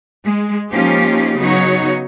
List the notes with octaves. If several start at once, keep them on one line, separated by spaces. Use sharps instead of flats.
G#3
F3 A#3 C#4 D#4 F4 G4
C#3 F#3 B3 D#4 F#4 C#5